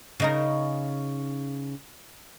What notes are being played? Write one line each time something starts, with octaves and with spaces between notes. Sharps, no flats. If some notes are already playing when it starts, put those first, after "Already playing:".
C#3 D#4 A#4